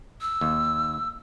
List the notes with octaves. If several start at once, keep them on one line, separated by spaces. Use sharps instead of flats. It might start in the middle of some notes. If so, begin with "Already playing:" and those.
E6
D#2